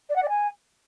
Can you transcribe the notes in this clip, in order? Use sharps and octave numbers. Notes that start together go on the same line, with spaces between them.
D5
F#5
D5
G#5